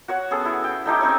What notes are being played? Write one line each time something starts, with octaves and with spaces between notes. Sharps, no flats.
F#4 C#5 F#5
B3 C#4 G#4 A4
E4
G5
A3 D#4 E4 G4
C4 C#4 D#4 C#5